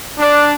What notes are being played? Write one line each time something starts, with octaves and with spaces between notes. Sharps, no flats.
D4